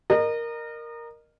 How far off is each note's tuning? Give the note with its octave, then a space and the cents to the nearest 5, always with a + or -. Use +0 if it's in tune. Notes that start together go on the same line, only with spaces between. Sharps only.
A#4 +0 D#5 -30